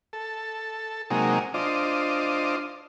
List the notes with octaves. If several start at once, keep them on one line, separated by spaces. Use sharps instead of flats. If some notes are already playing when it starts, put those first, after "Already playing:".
A4
C3 F#3 G#3 A#3 D#4
D4 F4 C5 D#5